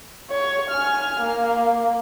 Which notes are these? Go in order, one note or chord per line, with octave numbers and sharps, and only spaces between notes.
C#5
G#5 F6
A#3